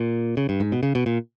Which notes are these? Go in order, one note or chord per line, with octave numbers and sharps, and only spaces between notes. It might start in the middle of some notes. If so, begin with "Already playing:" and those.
Already playing: A#2
C#3
G2
G#2
B2
C#3
B2
A#2